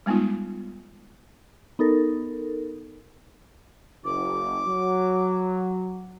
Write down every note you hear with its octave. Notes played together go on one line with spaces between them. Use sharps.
G3 G#3 B3 D#4 F4
B3 D#4 A4 A#4
F#1 D6
F#3